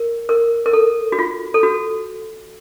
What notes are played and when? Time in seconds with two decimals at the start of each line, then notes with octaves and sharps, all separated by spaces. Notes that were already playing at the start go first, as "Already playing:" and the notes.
Already playing: A#4
0.29 A#4
0.66 A#4
0.73 A4
1.12 F#4
1.19 F4
1.54 A4
1.63 F#4